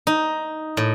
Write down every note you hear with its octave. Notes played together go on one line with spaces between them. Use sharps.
D#4
A2